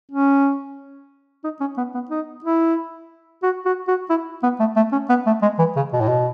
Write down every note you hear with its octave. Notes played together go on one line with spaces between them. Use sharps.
C#4
D#4
C#4
B3
B3
D#4
E4
F#4
F#4
F#4
E4
B3
A3
A3
C#4
B3
A3
G#3
E3
C#3
B2
A2
B2